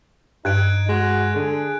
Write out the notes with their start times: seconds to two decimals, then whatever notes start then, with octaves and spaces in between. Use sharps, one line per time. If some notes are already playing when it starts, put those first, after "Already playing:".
0.45 G2 D#4 F#6 G#6 D7
0.89 G#3 F#4
1.35 D3 G#4